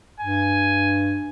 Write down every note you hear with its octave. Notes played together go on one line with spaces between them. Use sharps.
G2 G#5